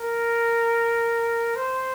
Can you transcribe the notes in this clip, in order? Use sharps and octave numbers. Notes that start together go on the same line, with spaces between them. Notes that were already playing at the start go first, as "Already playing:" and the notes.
Already playing: A#4
C5